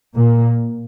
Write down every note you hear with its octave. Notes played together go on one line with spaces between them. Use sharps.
A#2 A#3